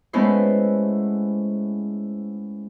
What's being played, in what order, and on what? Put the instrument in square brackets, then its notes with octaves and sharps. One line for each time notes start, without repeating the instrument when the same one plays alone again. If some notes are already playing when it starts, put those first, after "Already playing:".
[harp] G#3 A3 B3 C#4 E4 C5